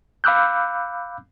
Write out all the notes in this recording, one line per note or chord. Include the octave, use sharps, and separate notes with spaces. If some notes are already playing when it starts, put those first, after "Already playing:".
F5 B5 D6 E6 F#6 G6